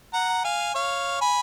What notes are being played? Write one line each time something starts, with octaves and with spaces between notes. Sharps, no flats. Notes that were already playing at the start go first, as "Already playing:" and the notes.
F#5 A#5
F5 G#5
C#5 F5
G#5 B5